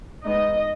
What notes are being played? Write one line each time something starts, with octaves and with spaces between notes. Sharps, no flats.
G#3 B3 D#4 D#5